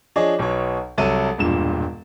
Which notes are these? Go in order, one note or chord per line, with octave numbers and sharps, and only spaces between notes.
F3 D4 G#4 C#5 D#5
B1 B2 B3 C#5
C2 F#3 A4 A5 D#7
E1 G2 A#2 E7